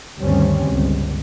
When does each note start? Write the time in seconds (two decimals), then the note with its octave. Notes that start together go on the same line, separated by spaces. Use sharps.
0.20 D2 G2 D#3 G3 C4 C#4
0.68 G1 C#2